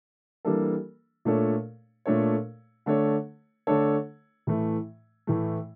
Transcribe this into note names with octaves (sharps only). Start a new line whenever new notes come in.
E3 G3 A#3 D4 A4
A#2 A3 D4 A4 C#5
A#2 A3 D4 A4 C#5
D3 A3 D4 A4 C#5
D3 A3 D4 A4 C#5
A2 E3 A3
A2 E3 A3